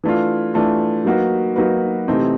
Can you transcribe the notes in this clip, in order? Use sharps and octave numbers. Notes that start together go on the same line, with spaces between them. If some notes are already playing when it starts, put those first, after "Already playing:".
E3 A3 D4 F4
E3 A3 D4 F4
F#3 A#3 D#4 F#4 B4
F#3 A#3 D#4 F#4 B4
C3 E3 A3 C4 D#4